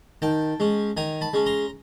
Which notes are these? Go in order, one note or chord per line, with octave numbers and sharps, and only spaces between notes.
D#3 G5 A5
G#3 C#4
D#3 G#5 A#5
A5 B5
G#3 C#4
A#5 C6